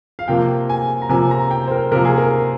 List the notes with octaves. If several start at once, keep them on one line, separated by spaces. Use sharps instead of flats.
F5
C3 F3 A#3 G5
G#5
A#5
C3 F3 A#3 G#5
A#5
G5
C5
A#4
C3 F3 A#3 A#4
G#4
A#4